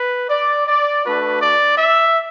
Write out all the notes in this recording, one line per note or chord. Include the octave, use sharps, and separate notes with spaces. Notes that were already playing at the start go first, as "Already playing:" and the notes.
Already playing: B4
D5
D5
A3 D4 F#4 B4
D5
E5